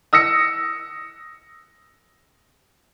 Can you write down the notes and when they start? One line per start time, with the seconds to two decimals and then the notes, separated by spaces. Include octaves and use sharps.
0.13 D#6 E6 A#6 C#7